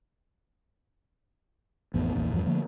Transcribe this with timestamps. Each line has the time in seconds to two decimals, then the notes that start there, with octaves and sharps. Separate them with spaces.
1.94 A1 F2 B3
2.15 A#1 E2 A#2
2.33 E2 G2 F3
2.46 D3 F3 A3 A#3